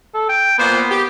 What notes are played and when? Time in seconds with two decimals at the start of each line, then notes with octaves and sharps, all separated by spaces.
0.14 A4
0.29 G5
0.58 A#2 A#3 B3 C5
0.90 G4